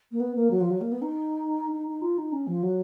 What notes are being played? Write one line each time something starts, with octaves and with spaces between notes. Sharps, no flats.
A#3
B3
A#3
F#3
F3
F#3
A#3
B3
D#4
D#4
D#4
F4
D#4
C#4
F3
F#3